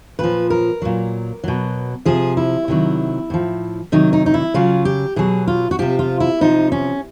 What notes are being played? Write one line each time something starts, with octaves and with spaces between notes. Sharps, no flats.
A#2 F3 B4
A#4
A#2 F#3
B2 F#3
C3 F3 G#4
E4
C3 D#3 F#3
A2 F3
C3 D#3 F#3 D#4
D#4
D#4
E4
C#3 F#3 F4
G4
B2 F#3 G#4
F4
F#4
C3 F3 G4
F4
E4
C3 F3 D#4
C#4